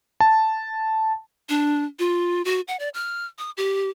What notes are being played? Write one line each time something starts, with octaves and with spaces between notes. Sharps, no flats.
A5
D4
F4
F#4
F#5
D5
F6
D#6
G4